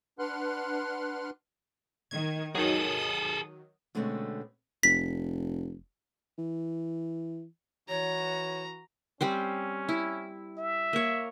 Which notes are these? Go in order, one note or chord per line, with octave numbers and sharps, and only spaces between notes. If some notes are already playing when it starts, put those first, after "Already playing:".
D4 B4 F#5 C6 F6 F#6
D#3 G#6
D#3 F#3 G#4 A4 D#6
B2 D3 G#3 A3 C4 C#4
F1 B6
E3
E3 F#4 C#5 A#5
G3 C4 C#4 C5
E4
E5
A#3 C#5